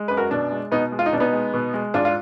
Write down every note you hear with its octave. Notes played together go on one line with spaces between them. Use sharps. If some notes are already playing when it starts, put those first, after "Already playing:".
Already playing: G#3
F#2 B4
F#4 A#4
B2 D4
G#3
B2 B3 D#4
G#3
F4
D#4
B2 D4
B3 D#4
G#3
B2
G#3
G#2 D4 F4
F4